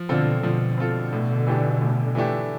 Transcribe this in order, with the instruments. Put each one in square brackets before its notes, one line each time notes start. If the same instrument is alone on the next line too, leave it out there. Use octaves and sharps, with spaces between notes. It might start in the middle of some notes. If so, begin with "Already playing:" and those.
Already playing: [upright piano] F3
[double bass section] B2 D3 [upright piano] C4 F4 A4
[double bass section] B2 D3 [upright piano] F3
[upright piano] C4 F4 A4
A2
E3 A3 D4 G4
A2
E3 A3 D4 G4